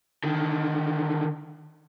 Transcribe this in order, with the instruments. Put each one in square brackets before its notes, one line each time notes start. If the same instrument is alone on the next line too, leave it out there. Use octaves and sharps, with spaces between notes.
[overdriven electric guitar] D3 D#3